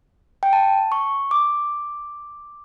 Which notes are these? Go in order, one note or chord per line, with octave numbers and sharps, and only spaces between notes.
G5
A5
C#6
D6